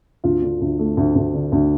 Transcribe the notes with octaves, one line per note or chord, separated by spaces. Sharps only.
D2 F4
D3
D2
A3
D2
D2
D3
D2